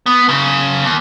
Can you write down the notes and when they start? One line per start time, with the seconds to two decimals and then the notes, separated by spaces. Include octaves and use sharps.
0.06 B3
0.29 F#2 C#3
0.85 D#2